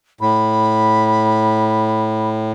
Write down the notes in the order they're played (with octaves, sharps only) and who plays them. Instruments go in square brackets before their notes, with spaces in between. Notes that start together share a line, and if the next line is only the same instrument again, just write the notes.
[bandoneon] A2 [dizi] B5